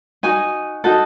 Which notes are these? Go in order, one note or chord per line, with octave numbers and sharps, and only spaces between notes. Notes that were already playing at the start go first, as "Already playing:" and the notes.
D#4 F#4 G#5
D#4 F#4 A4